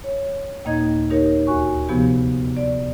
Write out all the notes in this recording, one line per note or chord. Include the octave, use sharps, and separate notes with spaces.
C#5
D#2 A#2 A#3 D#4 D#5 G#6
D#4 G4 A#4 C#5
D2 F#4 G#5 C#6
C3 F3 B3 G4
D5